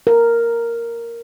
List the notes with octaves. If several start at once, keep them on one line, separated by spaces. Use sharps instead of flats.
A#4